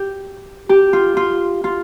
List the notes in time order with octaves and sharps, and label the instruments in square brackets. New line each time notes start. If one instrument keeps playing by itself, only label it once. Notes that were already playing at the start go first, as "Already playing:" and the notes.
Already playing: [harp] G4
G4
F4
F4
F4